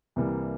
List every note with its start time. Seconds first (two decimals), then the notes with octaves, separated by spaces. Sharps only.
0.16 C2 C3 E3 G3 A#3